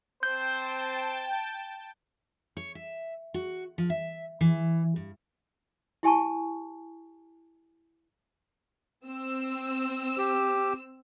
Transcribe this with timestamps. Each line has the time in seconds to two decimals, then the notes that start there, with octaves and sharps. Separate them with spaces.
0.23 C4 C5 G5 A5 G6
2.57 C#5
2.75 E5
3.34 F#4
3.78 F3
3.90 E5
4.41 E3
4.96 G2
6.03 E4 G4 G#5 A5 C#6
9.04 C4 E6
10.18 G4